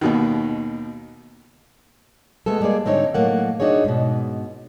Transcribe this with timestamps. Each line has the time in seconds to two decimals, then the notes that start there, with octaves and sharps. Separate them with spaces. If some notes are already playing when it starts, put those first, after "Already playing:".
0.01 D#2 B2 D#3
2.46 G#3 A3 B3 A4
2.61 G3 G#3 A#3 G#4 D5
2.85 G#2 D3 C4 D#4 A#4 C#5
3.14 A2 F#3 A3 A#3 F#5
3.60 D4 D#4 F#4 G#4 C#5
3.84 G#2 B2